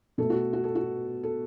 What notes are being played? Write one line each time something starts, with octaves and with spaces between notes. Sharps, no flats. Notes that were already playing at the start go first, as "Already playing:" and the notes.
B2 A3 A4
F#4
F#4
A4
F#4
A4